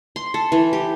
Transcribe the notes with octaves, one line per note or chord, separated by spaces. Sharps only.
C6
A4
E3
G4